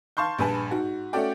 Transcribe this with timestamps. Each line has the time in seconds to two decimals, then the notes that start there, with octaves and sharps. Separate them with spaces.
0.17 F5 A5 C6 C#6 G6
0.38 A#1 G2 B4 G#5 A5 B5
0.71 G#2 F#4
1.13 A3 C#4 F#4 A4 D5 G5